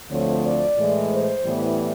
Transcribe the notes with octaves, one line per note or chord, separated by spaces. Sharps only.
D2 D3 F3 A3 C4 C#5
D5
A2 E3 G#3
C5
A2 E3 G3 B3